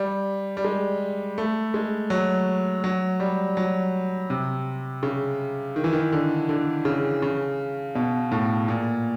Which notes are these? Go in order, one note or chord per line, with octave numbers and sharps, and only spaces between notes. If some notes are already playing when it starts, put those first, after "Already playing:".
Already playing: G3
G3
G#3
A3
G#3
F#3
F#3
G3
F#3
C3
C#3
D#3
E3
D#3
D3
D3
C#3
C#3
B2
A2
A#2